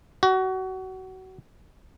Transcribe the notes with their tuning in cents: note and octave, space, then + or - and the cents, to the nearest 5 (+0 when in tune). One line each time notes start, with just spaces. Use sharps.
F#4 +25